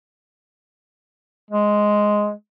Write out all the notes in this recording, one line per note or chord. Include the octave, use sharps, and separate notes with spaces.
G#3